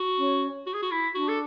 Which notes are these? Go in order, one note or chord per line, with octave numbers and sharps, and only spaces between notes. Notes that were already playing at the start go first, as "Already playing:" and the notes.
Already playing: F#4
C#4
F#4
G#4
F#4
E4
D4 F#4
A4